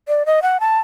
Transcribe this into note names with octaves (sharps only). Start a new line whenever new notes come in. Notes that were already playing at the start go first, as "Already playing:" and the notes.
D5
D#5
F#5
A5